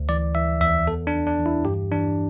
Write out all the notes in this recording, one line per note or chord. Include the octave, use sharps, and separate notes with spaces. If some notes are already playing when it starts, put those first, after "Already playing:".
Already playing: D2
E3 D5
E3 E5
E2 E5
E2 A4
D4
E2
D4
E3
E4
G2 G4
E3 D4